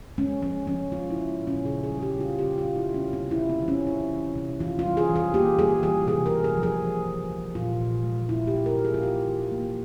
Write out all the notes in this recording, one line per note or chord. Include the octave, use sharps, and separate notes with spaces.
G#3 C#4
F3 C#4
F3 C#4
G#3 F4
E4
G#3
A#2
C#4
C#3 G#4
G#4
G3
G4
C#3
F4
C#3 G4
F4
G3
E4
G3
C#4
C3 C4
E4
C3
C4
E3
C#4
E3 E4
C3
C3
E3 F4
F4
G3
G#4
E3
G#4
A#3 G4
G3 G#4
E3 G#4
C3 G#4
A#4
C3
G#4
F3
G#4
C3
C3
C3
A#2 F4
A#2
G#3
G#3 E4
G4
G#3
A#4
G#3
G#4
F4
A#3 G4
E3
A#3